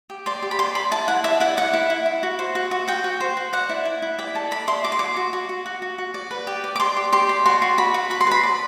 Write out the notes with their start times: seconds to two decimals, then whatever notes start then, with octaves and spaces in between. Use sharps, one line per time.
0.10 G4
0.26 D5 C6
0.42 G4
0.51 B5
0.59 D5 C6
0.75 D5 B5
0.91 E4 A5
1.08 E4 F#5
1.24 D5 E5
1.40 E4 F#5
1.57 E4 F#5
1.73 E4
1.90 E4
2.06 E4
2.23 F#4
2.39 C5
2.55 F#4
2.71 F#4
2.88 F#4 G5
3.04 F#4
3.20 C5
3.37 F#4
3.53 D5 F#5
3.69 E4
3.85 E4
4.02 E4
4.19 D5 G5
4.35 A4 A5
4.51 D5 B5
4.67 E4 C6
4.84 F#4 D6
4.92 C6
4.99 F#4 D6
5.17 F#4
5.33 F#4
5.49 F#4
5.66 F#4
5.82 F#4
5.98 F#4
6.14 D5
6.31 B4
6.47 G4
6.64 D5
6.76 D6
6.80 D5 C6
6.96 G4
7.12 G4 C6
7.29 D5
7.46 F#4 C6
7.62 F#4
7.78 F#4 B5
7.94 F#4
8.10 F#4 B5
8.21 C6
8.27 B4 B5
8.43 D5